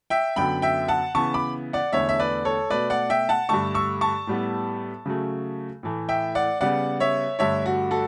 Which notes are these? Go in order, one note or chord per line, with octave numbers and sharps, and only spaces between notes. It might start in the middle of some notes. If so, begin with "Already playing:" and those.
E5 G5
F#2 D3 F#3 B3 G5 B5
E5 G5
F#5 A5
C#3 E3 B3 A5 C#6
B5 D6
D5 F#5
E2 D3 A3 C#5 E5
E5
B4 D5
A4 C#5
B2 A3 B4 D5
D5 F#5
E5 G5
F#5 A5
G2 D3 A3 A5 C#6
C#6 E6
A5 C#6
A2 G3 B3
C#3 F#3 A3
A2 E3 A3
E5 G5
D5 F#5
C#3 G3 B3 D5 F#5
C#5 E5
G2 D3 A3 C#5 E5
F#4
F#4 A4